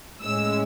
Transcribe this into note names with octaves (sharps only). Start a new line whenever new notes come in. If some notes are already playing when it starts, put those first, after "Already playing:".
A2 G#3 C#4 E6